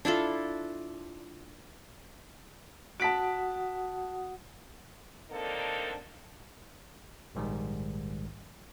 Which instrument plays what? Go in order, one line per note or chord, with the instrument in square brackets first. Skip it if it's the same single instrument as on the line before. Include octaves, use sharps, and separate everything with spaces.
[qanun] D4 E4 F4 A4
[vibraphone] F#4 F#5 D#6 [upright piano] A5 B6 D7
[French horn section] D3 A#3 C4 D4 D#4 A4
[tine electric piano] A#1 G#2 D#3 G3